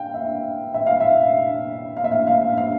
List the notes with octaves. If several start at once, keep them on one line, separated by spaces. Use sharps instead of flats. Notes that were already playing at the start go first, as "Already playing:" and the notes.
Already playing: F5 G5
E5
E5
F5
E5
F5
E5
F5
F5
F5